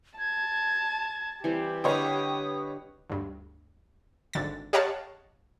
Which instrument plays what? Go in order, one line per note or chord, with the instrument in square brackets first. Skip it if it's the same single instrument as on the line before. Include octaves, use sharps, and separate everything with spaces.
[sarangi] A5 [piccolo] G#6
[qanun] E3 G3 C4 [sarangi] G4
[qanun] D3 G3 F5 [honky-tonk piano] B4 C#5 D#5 [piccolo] D#6
[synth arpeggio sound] D2 G2
G#1 D3 A6
G4 C#5 D#5 F5 F#5 A5